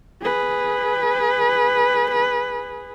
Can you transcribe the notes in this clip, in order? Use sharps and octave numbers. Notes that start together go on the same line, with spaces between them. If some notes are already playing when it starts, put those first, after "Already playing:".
G#4 B4